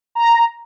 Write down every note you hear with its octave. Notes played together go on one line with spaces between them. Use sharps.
A#5